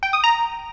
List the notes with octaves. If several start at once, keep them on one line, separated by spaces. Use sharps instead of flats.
G5
D#6
A#5